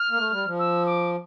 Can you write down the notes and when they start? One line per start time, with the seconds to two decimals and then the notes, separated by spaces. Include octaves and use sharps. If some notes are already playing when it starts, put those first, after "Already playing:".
Already playing: F6
0.10 A#3
0.18 A3
0.31 G3
0.45 F3
0.59 E6
0.86 D6